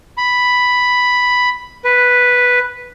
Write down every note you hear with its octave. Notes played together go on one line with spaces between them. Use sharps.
B5
B4